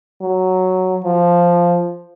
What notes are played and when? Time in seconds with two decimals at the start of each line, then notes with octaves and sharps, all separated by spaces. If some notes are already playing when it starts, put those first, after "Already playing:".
0.22 F#3
1.05 F3